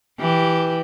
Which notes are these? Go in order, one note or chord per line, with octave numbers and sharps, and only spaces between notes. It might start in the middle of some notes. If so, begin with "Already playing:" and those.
E3 G4